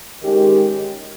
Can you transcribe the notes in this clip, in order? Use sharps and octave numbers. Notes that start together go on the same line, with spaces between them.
D#3 G#3 C#4 G4